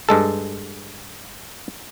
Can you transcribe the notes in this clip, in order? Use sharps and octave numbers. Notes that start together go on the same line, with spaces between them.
G2 G#3 A4